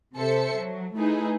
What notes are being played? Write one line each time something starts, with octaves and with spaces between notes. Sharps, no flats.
C3 A4 C5 E5 C#7
F#3
A3 D#4 E4 G#4 B4